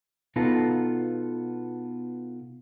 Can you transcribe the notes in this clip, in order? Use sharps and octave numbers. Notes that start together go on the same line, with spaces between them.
B2 B3 D#4 F4 A4 A#5